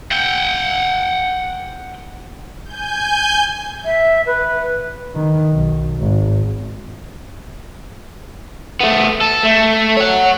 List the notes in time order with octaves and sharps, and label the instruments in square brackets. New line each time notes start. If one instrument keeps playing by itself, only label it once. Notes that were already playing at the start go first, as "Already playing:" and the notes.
[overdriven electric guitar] F#5 G5
[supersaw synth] G#5 G6
[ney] E5
B4
[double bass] D#3
B1
G#1
[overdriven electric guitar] A3 B3
A4
A3
C#5 F#5